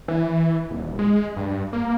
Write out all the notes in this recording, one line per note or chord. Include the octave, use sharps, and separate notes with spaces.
E3
D#1
G#3
G2
A#3